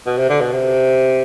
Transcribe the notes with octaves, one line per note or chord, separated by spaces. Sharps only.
B2
C3
D3
B2
C3